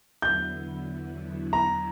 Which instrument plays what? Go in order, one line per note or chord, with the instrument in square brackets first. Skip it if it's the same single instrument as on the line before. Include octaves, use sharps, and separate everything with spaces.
[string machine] E2 D3 F#3 B3 E4 [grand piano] G6
[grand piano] A#5